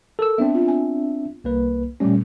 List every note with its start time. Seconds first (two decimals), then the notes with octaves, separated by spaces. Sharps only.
0.19 A4 A#4 E6
0.38 B3 C4 D4 E5
0.55 F4
0.68 G#5
1.44 C2 A#3 B4
2.00 A#2 G3 A3 C#4